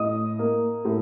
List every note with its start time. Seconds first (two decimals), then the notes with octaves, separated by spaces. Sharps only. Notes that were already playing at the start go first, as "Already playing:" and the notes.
Already playing: A2 D#5 D#6
0.39 A#3
0.85 A2